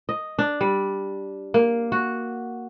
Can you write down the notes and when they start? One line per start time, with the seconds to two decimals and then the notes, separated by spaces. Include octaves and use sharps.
0.09 D#5
0.39 D4
0.61 G3
1.54 A#3
1.92 F#4